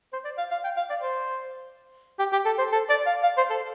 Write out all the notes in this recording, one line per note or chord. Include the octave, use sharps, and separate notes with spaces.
C5
D5
F5
F5
G5
F5
D5
C5
G4
G4
A4
C5
A4
D5
F5
F5
C5
A4